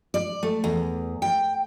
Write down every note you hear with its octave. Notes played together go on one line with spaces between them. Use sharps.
D5
A3
E2
G5